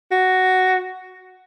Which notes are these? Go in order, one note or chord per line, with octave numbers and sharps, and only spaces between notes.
F#4